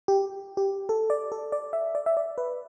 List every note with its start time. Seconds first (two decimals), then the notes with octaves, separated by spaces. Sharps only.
0.08 G4
0.57 G4
0.89 A4
1.10 D5
1.32 A4
1.52 D5
1.73 E5
1.95 D5
2.06 E5
2.17 D5
2.38 B4